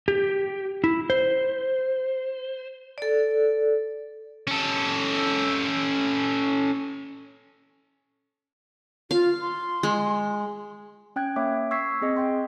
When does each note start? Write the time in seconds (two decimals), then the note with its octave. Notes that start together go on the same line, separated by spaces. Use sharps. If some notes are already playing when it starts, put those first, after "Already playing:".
0.08 G4
0.84 E4
1.10 C5
2.98 A4 D5
4.47 C#4 A4
9.11 F4 F5
9.41 C6
9.83 G#3
11.16 C#4 G5 F#6 G#6
11.36 A#3 C#5 E5 D6
11.71 C#6 E6 G#6 B6 C7
12.02 C4 G#4 D#5
12.17 D#5 G5 C6